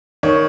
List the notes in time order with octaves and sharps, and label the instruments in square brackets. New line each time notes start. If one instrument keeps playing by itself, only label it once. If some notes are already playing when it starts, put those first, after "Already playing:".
[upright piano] D#3 C#5